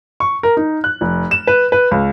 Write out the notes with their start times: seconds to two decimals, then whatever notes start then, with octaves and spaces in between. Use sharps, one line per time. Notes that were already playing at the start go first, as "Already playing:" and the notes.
0.20 C#6
0.43 A#4
0.57 D#4
0.84 F#6
1.01 F1
1.31 E7
1.47 B4
1.72 B4
1.91 C#2